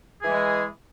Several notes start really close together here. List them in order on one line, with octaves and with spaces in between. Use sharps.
G#4 E3 G#3